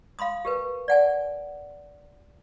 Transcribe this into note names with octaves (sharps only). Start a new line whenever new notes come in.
F5 B5 C6 D#6
G4 A#4 B4
D5 F#5 G#5